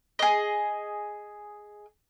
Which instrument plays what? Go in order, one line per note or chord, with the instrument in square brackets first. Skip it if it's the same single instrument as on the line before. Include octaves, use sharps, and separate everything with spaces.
[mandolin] G#4 D#5